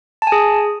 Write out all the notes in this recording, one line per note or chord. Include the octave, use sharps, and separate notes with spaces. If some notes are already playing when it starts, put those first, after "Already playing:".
A5
G#5
G#4